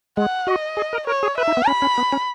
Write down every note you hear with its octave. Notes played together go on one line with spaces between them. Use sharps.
G#3 F#5
F#4 D#5
G#4
A#4
A#4 C#5
G#4
B4 E5
D#4
B3
C#4 B5
C#4
B3
C#4